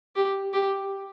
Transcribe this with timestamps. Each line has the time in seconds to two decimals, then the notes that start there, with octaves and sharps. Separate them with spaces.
0.16 G4
0.53 G4